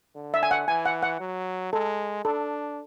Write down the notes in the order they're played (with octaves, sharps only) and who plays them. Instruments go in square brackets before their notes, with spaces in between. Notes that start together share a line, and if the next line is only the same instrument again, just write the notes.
[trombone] D3
[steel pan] E5
G#5
F#5
[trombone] E3 [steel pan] G#5
[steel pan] F#5
F#5
[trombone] F#3
[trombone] G#3 [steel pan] A4
[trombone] D4 [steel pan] A4